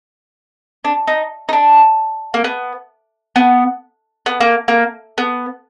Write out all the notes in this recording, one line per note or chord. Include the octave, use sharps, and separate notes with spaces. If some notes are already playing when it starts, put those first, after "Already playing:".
D4
D#4
D#4
D4
A#3
B3
B3
B3
A#3
A#3
B3